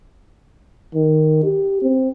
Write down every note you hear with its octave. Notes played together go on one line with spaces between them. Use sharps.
D#3
G4
C4